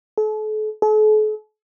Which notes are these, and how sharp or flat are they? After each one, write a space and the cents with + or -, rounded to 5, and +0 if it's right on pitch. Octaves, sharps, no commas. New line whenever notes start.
A4 -40
A4 -45